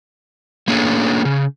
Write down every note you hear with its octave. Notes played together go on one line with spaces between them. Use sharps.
A3 A#3 C#4 D4 G#4
C#3